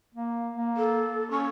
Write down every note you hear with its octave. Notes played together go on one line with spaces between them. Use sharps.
A#3
A#3
A4
C#4 C#6